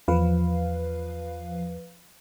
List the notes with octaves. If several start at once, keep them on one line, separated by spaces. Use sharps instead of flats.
E2 F3 B4 F5